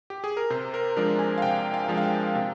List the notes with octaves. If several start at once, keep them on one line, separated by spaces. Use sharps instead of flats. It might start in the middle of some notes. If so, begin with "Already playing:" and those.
G4
G#4
A#4
C3 C5
A#4
F3 G#3 D4 A#4
G#5
F5
C3 G5
F5
F3 G#3 D4
F5
G5
C3